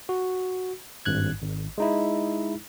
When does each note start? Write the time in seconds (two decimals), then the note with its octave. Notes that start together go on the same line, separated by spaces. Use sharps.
0.09 F#4
1.05 G#1 G2 F#6 G#6
1.43 G#1
1.78 G#3 D#4 E4